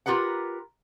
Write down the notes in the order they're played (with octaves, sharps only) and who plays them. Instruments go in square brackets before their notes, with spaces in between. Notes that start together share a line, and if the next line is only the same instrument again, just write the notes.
[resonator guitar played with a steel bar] F4 G4 A#4 B4 F#5